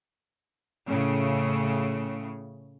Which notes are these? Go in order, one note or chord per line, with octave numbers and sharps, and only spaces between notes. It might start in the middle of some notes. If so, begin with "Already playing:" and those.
A2 C#3